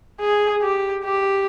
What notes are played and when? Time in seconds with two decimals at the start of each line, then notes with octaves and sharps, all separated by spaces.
0.20 G#4
0.62 G4
1.04 G4